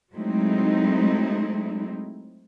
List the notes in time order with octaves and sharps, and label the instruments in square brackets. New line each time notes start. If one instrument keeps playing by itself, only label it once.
[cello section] F#3 G#3 A3 C4 D#4 E4